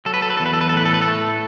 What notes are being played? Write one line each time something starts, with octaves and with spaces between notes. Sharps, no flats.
F#3 A4
B4
A4
B4
E2 A4
B4
A4
B4
A4
A2 B4
A4
B4
A4
A3